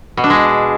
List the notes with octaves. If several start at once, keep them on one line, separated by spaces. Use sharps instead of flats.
B2
D4
G#3